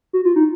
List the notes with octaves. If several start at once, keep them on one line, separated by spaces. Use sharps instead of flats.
F#4
F4
D#4